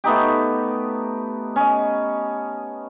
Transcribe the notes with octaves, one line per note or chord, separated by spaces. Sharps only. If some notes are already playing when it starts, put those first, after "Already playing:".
A3 B3 D#4 G4
C#4 D#5